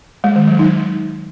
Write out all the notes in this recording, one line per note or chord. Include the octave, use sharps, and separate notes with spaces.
G#3
D#3
F#3
D#4